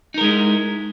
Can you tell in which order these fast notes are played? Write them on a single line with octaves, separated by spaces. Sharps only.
D#4 A#4 G#3 E4